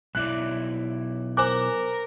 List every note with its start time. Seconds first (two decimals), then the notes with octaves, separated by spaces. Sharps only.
0.15 B1 E4 D5 F#6
1.37 A#4 C5 G#5 D6 F#6